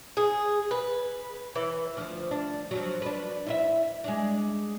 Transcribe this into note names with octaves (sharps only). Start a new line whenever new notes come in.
G#4
B4
E3
D2 F3
D4
F3 F#3
D4 B4
E4 C5 E5
G#3 D4